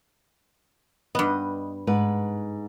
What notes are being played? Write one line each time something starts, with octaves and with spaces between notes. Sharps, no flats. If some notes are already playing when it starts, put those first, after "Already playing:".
G2 B3 D#5
G#2 B4